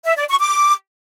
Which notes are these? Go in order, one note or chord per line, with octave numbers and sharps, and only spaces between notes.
E5
D5
C#6
D6